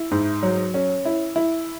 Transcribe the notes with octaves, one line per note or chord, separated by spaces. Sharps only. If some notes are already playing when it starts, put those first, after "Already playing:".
Already playing: E4
G#2
F#3
C#4
E4
E4